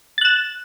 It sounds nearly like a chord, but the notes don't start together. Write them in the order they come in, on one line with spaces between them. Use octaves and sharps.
A6 F#6 E7